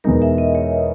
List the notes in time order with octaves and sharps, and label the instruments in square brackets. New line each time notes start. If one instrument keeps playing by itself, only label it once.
[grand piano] E2 B2 G#3 D#4 [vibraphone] A#4
[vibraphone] E5
D#5
C#5